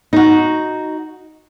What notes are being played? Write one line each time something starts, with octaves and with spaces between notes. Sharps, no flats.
D#4 F#4